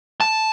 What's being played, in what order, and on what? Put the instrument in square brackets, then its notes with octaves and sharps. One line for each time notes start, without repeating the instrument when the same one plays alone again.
[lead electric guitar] A5